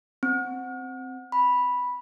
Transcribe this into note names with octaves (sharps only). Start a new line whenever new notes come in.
C4
B5